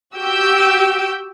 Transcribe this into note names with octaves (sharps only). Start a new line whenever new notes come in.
F#4 G4 E6 G6 D7